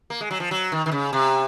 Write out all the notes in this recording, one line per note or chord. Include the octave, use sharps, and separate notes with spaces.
A#3
G#3
F#3
F3
F#3
D#3
D#3
C#3
C3